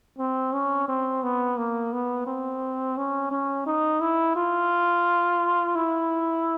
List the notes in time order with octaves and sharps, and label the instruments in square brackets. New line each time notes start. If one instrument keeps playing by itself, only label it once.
[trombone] C4
C#4
C4
B3
A#3
B3
C4
C#4
C#4
D#4
E4
F4
E4